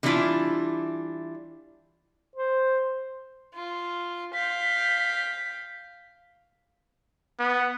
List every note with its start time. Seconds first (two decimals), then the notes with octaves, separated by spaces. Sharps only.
0.03 D3 E3 G3 D4 E4 F4
2.36 C5
3.54 F4
4.34 F5 G5 B6
7.39 B3